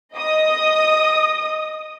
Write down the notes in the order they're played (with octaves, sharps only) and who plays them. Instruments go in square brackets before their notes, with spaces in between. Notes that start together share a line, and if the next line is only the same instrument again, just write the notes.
[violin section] D#5 D#6